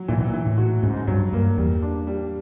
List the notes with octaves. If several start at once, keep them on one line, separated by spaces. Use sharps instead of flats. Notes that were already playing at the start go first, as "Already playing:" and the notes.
Already playing: F#3
A#2 E3
B2
A#2
E3
A2
F#4
G#2 C#3
G2 F#3
G2 A#3
E2 G3
D4
G3